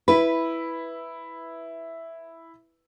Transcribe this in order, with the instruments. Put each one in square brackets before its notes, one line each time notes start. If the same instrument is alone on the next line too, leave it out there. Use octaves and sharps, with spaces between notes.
[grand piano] E4 B5 [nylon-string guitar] B4